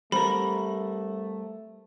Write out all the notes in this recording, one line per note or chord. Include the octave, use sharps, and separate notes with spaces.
G3 A3 C4 A#4 C5 B5